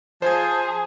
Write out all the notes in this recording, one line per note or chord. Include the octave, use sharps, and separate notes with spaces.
F3 G#4 C5 A5 G#6